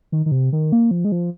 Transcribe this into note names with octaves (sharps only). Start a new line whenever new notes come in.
D#3
D#3
C3
D#3
A#3
F3
G#3
F3